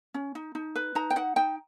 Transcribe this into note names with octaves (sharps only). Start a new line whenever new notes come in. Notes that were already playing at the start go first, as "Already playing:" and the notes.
C#4
D#4
D#4
B4
D#4 A#5
G5
D#4 F#5
D#4 G5